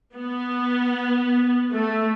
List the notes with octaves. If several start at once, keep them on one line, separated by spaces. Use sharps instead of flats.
B3
A3